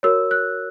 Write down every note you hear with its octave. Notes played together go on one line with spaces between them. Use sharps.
F#4 A#4 C#5 E6
F#6